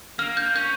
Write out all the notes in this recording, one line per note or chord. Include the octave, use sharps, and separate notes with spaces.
A#3 F6
G6
C#4 G6